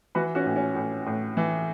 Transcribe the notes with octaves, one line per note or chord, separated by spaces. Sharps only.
E3 F#4 B4
C#4 F#4
A2
C#4
A2
A2
E3